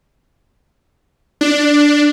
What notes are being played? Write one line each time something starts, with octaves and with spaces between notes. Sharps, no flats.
D4